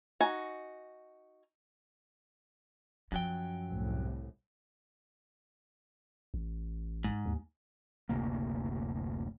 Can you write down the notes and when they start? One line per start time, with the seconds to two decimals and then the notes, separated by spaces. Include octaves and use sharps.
0.20 D#4 F#4 G#5
3.12 F#2 F3 F#3 G5
3.69 C2 A2
6.34 A1
7.04 G#2
7.26 D#2
8.09 F#1 D2 C3 A#3